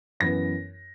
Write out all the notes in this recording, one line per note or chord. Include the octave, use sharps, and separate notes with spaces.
F#2 E3 B3 A#6